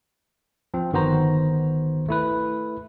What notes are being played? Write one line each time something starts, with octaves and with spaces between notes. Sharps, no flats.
F3 C4
G1 D#3 B3 F#4 C5 A#5
A3 E4 B4